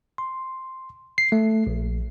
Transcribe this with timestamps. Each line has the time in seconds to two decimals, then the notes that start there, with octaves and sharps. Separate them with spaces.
0.18 C6
1.18 C7
1.32 A3
1.67 A#1